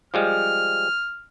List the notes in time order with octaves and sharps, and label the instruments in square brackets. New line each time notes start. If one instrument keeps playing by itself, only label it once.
[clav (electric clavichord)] F3 G3 G#3 [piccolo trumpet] F6